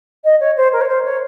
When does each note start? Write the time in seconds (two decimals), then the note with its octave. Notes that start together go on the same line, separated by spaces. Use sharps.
0.24 D#5
0.40 C#5
0.57 C5
0.73 A#4
0.81 C#5
0.88 C5
1.05 C#5